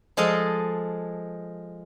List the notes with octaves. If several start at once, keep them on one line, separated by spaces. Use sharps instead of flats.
F3 G#3 A4 D#5 F5